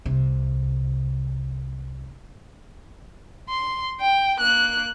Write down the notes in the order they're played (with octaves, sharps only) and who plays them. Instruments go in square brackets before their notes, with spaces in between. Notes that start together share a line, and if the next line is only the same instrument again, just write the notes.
[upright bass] C2 C3
[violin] C6
G5
A#3 F#6